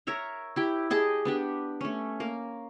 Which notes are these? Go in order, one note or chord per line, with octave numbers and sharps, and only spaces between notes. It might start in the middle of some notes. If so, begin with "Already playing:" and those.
A#4 C#5 E5 A#5
E4 G4 G5
G4 G#4 D#5 A5
B3 D4 G4
A3 C#4
A#3 A#4